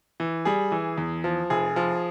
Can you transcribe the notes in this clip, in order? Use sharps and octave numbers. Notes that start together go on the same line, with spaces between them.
E3
G3 G#4
E3
E2
F3
F1 G#4
F3